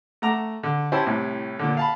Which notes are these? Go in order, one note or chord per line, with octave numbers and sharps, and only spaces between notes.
A3 F#5 A#5 D6
D3
C#4 E4 G4 C5 G#5 A5
C2 A2
A#2 D3
F5 A5 B5